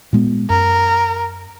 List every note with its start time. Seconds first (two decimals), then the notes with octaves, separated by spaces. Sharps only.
0.13 A#2 G#3 B3
0.50 F#2 A#4